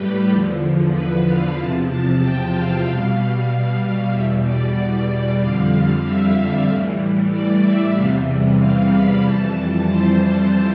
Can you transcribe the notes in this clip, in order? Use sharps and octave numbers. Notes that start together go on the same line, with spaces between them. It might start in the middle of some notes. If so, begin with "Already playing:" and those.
Already playing: A2 G3 G4 B4
E2 D3 F3
B4
F5
E2 C3 F3 A5
A5
G5
F5
B2 G3
E2 B2 G3 E5
D5
F2 D3 G3 F5
E5
A2 E3 G3
D5
E5
E2 C3 E3 G3 F5
F5
B5
F2 E3 G3 A5
C5